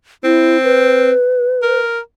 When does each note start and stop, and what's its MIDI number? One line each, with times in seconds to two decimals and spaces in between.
0.24 1.12 60
0.24 0.58 64
0.64 1.79 71
1.63 2.00 70